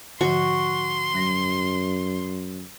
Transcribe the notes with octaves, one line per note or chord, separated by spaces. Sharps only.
G#2 D3 F3 F#4 C6 C#6
F#2 F#3 A#6